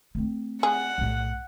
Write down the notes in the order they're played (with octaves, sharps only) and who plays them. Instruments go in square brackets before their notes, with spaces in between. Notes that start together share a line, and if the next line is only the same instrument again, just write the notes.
[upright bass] A3 C4
[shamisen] G#4 [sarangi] F#5
[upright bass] B1 A2